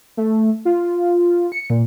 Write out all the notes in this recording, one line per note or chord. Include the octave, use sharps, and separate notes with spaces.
A3
F4
C#7
A#2